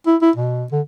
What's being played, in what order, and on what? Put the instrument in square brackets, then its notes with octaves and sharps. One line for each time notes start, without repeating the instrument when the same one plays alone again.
[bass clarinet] E4
E4
B2
D3